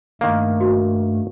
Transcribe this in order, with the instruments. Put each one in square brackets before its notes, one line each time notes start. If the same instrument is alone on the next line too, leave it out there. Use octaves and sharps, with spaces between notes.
[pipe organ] G2 A3 [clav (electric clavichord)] D#3 A#3
[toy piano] F#4